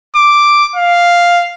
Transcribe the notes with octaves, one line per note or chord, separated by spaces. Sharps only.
D6
F5